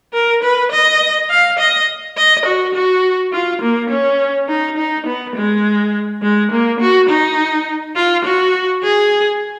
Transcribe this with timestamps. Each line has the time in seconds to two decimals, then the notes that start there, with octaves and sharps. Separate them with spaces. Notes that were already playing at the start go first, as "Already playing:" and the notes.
0.14 A#4
0.43 B4
0.72 D#5
1.30 F5
1.59 D#5
2.17 D#5
2.46 F#4
2.75 F#4
3.33 F4
3.62 A#3
3.90 C#4
4.49 D#4
4.78 D#4
5.07 B3
5.36 G#3
6.22 G#3
6.52 A#3
6.80 F#4
7.09 D#4
7.96 F4
8.25 F#4
8.84 G#4